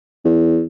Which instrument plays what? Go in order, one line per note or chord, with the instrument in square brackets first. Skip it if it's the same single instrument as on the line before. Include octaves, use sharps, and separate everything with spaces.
[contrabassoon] E2